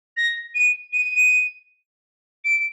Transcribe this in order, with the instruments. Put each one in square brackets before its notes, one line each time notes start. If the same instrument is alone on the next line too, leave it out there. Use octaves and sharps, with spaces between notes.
[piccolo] A#6
D#7
D#7
D7